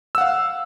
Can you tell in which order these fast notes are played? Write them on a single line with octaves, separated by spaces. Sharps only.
E6 F#5 F5